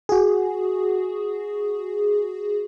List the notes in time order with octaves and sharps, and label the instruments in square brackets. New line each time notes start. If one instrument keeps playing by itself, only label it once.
[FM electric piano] F#4 G#4